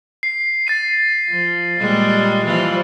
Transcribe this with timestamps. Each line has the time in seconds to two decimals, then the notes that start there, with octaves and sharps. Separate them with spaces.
0.23 C7
0.67 A6 C7 D#7
1.29 F3
1.79 A#2 G3 G#3
2.45 E3 F3 G3